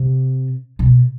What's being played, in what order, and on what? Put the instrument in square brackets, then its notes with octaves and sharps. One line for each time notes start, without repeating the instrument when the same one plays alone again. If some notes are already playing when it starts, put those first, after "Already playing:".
Already playing: [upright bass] C3
B2